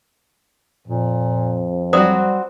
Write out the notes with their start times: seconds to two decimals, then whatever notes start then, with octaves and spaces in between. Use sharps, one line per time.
0.87 F2 A#2
1.93 F#3 G3 C4 F#4 C5 D5 D#6